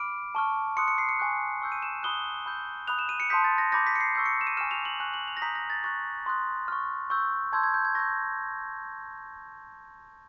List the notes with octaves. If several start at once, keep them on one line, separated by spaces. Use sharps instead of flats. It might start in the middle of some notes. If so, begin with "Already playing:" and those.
Already playing: B5 D6 F6 D7
A5 C#6 F6
C6 D#6 F#6 C#7
C#7
C7
C#7
G#5 C#6 F#6
C#6 E6 G6
D#7
E7
B5 D#6 F#6 G7
B5 E6 G6
B5 D#6 F#6 F7
E7
D#7
C#7
A5 C6 D#6 G6 B6
A6
A#6
B5 D6 G6 A#6
B6
C#7
C7
C#6 E6 G6 C7
C#7
E7
D#7
G#5 C#6 F6 E7
F7
F#7
G#5 C#6 F#6
F#7
F7
A#6
A#5 D#6 G6 B6
A#6
A6
C#6 F#6 A6
C6 D#6 F#6
C#6 F6
C#6 E6 G6
A5 C6 E6 G6 G#6
G#6
G6
G#6
C#6 E6 G6 A#6